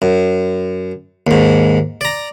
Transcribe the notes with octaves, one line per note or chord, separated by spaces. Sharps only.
F#2
D#2 G#2
D5 A#5